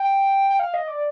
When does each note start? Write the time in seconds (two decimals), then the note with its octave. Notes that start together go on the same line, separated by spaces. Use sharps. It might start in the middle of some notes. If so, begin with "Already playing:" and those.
Already playing: G5
0.50 G5
0.59 F5
0.74 D#5
0.88 D5